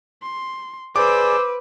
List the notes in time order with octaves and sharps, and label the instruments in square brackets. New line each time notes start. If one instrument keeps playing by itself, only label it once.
[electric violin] C6
[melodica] G#4 D5 [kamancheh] B4 [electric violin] C5 E6 [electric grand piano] D6